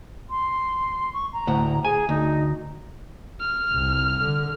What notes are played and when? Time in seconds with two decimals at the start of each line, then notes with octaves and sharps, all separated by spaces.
0.30 C6
1.14 C#6
1.33 A#5
1.47 D2 A2 F#5
1.85 G#4 G#5
2.09 D2 D#4
3.40 F6
3.72 C2
4.22 D3